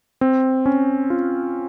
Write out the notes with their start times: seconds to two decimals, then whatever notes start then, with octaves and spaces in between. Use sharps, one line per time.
0.21 C4
0.66 C#4
1.10 F4